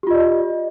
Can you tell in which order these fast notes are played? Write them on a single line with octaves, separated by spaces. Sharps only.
G4 F4 D#5 D5